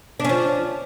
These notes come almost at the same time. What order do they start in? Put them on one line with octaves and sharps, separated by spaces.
D4 C#4 F3